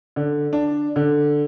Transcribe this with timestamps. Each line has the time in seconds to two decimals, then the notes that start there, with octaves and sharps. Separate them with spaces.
0.16 D3
0.53 D4
0.96 D3